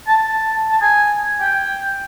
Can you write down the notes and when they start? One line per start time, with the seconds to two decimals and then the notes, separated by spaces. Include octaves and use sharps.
0.08 A5
0.71 A5
0.82 G#5
1.41 G5